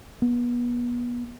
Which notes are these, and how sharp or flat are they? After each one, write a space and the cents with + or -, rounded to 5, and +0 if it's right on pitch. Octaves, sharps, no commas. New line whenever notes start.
B3 -30